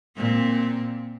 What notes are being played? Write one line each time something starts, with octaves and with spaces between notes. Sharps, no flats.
A#2 C4